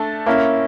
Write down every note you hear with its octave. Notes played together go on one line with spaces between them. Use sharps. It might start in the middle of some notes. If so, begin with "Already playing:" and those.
Already playing: A3 D4 A4
A#3 C#4 E4